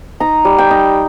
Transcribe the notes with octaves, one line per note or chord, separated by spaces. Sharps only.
D#4 A#5
G3
G5
D#4